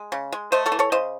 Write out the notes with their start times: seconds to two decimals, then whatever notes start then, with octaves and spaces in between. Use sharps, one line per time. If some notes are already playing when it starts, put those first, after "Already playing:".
Already playing: G#3
0.12 C#3
0.33 G#3
0.52 A3 C5 D#5
0.66 A4 C#5
0.72 E3
0.79 A4 C#5
0.92 C#3 C5 D#5